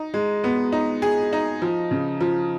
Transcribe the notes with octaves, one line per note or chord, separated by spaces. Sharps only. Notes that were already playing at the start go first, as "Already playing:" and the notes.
Already playing: D#4
G#3
B3
D#4
G#4
D#4
F3
C#3
F3